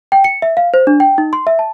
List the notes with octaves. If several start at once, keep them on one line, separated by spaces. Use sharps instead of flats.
G5
C#7
E5
F5
C5
D4
G5
D#4
C6
E5
A5